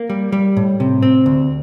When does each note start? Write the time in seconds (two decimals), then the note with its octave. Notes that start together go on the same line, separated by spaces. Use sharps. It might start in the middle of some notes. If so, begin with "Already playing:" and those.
Already playing: A#3
0.10 G3
0.32 G3
0.57 A2
0.80 C3
1.03 C4
1.26 D2